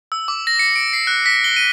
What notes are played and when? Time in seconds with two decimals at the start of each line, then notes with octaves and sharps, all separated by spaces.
0.12 E6
0.28 D6
0.47 A#6
0.59 C#7
0.76 D7
0.93 C7
1.07 F#6
1.26 B6
1.44 G7
1.56 D#7